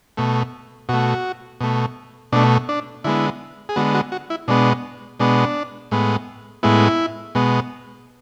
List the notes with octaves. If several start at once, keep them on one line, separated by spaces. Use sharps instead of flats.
B2 A3
B2 A3 F#4
B2 A3
B2 A3 D4
D4
D3 G#3 B3 E4
G#4
D3 G#3 B3 F#4
F#4
F#4
E4
B2 G#3 B3 D4
B2 G#3 B3 D4
A2 G#3 B3
A2 G#3 B3 E4
B2 G#3 B3